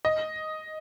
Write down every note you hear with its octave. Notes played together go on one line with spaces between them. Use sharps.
D#5